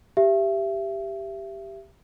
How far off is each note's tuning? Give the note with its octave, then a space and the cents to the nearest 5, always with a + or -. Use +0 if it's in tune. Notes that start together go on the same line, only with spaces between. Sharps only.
G4 +0 E5 +25